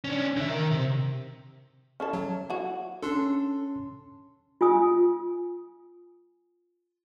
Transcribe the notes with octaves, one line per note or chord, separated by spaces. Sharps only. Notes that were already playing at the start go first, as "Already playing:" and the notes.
C#4 D4
D3 E5
D#3 A#4
C3
C#4 E4 A4
F#3
E4 F#4
C#4 D4 A4 A5 C6
F4 G#5 D#6